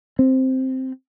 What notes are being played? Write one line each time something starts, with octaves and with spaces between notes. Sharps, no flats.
C4